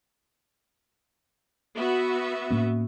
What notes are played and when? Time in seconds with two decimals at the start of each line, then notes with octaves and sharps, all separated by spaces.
1.75 B3 F#4 E5
2.51 A2 A#3 C#4